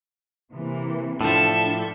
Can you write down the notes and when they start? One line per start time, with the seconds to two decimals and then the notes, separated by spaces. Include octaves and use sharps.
0.53 C3 E3 A#3
1.21 A2 F3 D4 A4 E5